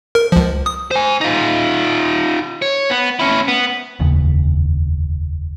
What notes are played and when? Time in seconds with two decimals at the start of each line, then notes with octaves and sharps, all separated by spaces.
0.15 A#4
0.32 C#2 F3
0.66 D#6
0.91 C5 G#5
1.21 D#4 F4
2.62 C#5
2.90 B3
3.20 C#4 E4
3.48 B3
4.00 F1 D#2 C#3